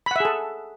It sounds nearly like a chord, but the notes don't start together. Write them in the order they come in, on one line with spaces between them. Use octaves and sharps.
B5 F#5 E5 G#4 A4